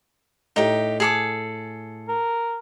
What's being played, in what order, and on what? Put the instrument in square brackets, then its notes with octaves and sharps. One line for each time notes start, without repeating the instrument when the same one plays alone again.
[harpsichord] A2 [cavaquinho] D#4 G4
[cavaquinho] G#4 A4 D6
[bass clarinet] A#4